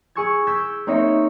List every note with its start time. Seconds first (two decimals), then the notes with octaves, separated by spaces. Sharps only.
0.15 G#4 G#5 C#6 E6 G#6
0.47 D6 E6 G6 G#6 B6
0.87 A#3 C4 D#4 C#5 D#5 E5